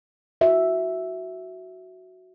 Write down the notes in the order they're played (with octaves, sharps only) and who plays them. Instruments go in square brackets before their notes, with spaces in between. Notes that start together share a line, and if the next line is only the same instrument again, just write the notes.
[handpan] F#4 E5